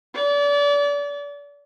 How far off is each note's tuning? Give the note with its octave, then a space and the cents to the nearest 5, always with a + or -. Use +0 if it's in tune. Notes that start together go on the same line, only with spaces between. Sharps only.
D5 -35